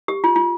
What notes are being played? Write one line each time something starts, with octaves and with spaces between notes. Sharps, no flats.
G4
F4
F4